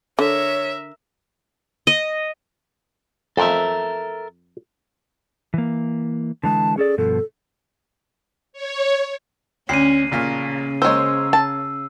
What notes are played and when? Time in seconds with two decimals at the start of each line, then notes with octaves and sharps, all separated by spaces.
0.19 D3 A#4 C#5 E5
1.87 D#5
3.37 F2 A4 A#4 E5
5.54 E3 A#3
6.44 D3 E3 G#3 A5
6.78 C#4 G#4 A4 D5
6.98 G2 B2 F3 A4
8.53 C#5
9.69 D2 C#4 C7 D#7
10.11 A1 A#2 C#3 F6
10.82 G#3 A#3 C5 C#5 E6
11.33 A5